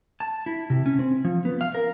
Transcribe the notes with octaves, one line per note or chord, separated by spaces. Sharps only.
A5
E4
C3
C#4
C4
F3
B3
F5
A#4